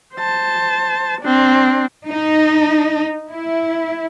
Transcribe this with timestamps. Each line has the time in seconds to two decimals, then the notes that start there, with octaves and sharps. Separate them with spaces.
0.15 C5 A5
1.21 C4 D4
2.06 D#4
3.28 E4